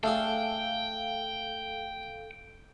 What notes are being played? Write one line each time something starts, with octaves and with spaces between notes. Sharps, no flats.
A3 D4 G#4 A4 F5 G5